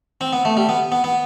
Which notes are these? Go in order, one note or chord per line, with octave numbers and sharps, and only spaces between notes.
C4
B3
A3
G3
B3
B3
B3